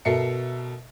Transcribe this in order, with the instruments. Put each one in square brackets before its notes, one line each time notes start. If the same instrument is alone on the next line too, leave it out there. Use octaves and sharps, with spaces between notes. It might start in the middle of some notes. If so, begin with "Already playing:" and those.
[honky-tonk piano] B2 A4 A#4 E5 C7 C#7